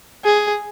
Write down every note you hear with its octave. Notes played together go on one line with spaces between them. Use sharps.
G#4